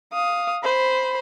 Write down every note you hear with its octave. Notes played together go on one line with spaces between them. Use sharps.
F5 D#6
C5 B5